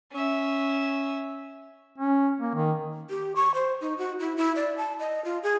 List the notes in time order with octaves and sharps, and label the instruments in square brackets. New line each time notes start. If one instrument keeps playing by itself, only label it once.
[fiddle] C#4 E5
[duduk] C#4
A#3
D#3
[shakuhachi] G4
C#6
C5
D#4
F#4
E4
E4
D5
A5
D#5
F4
G#4